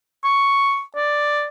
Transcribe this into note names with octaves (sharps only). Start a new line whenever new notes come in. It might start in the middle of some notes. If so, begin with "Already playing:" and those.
C#6
D5